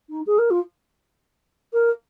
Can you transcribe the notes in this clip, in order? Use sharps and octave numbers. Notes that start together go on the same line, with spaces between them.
D#4
G#4
A#4
F4
A#4